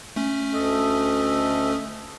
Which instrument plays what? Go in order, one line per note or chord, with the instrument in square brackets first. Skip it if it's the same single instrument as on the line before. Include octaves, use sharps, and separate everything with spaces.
[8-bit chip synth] A3 C#4
[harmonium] D2 A4 D#5